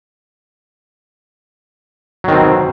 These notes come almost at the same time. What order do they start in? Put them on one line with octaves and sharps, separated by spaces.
F#3 D#3 C4 B2